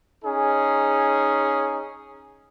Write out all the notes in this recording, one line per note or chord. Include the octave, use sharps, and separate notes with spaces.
C#4 D#4 G#4